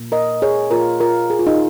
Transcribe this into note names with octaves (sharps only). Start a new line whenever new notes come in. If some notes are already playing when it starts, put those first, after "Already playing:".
Already playing: A#2 A#3
A#4 D#5
G#4 C#5
A#2 A#3 F4 A#4
F4 A#4
G#4
F4
D#4 G#4